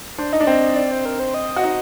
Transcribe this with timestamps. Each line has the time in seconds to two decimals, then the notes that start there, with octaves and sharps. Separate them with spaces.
0.18 D4 C5
0.33 D#4 D#5
0.40 D4
0.47 C4 D#5
0.76 D5
0.91 C5
1.05 A#4
1.20 C5
1.34 D#5
1.56 F#4
1.63 D#4